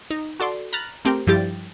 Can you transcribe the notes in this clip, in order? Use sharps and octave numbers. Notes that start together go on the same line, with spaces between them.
D#4
F#4 A4 D5 C6
A#5 B5 F6 F#6 A6
A3 C4 G4 A#4 G5
G2 F3 G3 E4 G4 A6